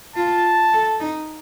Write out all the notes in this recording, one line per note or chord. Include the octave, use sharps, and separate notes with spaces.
F4 A5
A4
D#4